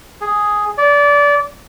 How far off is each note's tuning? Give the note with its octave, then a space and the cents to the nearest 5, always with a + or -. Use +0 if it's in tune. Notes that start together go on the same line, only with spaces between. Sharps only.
G#4 +0
D5 -25